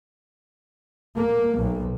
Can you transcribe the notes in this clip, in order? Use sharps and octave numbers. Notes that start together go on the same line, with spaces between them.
A#3
B1